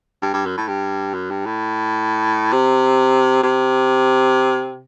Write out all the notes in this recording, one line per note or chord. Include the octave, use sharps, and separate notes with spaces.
G2
G2
F#2
A2
G2
F#2
G2
A2
C3
C3